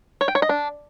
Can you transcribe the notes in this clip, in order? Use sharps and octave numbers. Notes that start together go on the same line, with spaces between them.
C#5
G5
C#5
D#5
D4